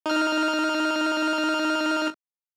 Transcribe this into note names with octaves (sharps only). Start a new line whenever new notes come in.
D#4 F6